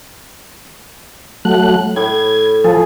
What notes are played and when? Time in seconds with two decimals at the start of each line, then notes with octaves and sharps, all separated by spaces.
1.45 F#3 A3 F#6
1.96 A2 B5 G#6
2.64 F3 G#4 A4